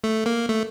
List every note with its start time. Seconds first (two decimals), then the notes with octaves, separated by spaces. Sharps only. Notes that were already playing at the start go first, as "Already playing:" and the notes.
0.04 A3
0.26 A#3
0.49 A3